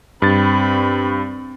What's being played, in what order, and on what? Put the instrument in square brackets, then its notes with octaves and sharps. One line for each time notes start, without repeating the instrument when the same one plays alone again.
[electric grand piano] G2 A6 [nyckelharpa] C4 B5